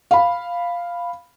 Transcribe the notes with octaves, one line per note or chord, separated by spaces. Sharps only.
F5 B5